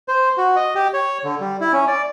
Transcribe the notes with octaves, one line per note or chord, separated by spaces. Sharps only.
C5
F#4
D#5
G4
C#5
D3
G3
E4
C#4
D5